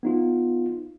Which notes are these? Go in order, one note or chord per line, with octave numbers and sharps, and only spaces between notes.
B3 D#4 F4